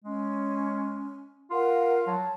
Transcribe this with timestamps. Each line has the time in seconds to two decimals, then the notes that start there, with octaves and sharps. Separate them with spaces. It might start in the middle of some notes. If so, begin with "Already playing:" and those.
0.04 G#3 C#4
1.51 F4 A#4 F5 F#5
2.07 F#3 A5